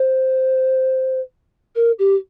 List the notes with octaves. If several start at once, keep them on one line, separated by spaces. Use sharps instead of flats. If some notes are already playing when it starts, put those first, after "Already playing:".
Already playing: C5
A#4
G4